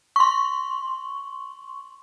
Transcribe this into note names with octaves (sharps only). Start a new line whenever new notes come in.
C6 C#6